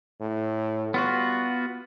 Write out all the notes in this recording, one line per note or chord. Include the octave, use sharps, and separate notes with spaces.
A2
G3 B3 F4 F#4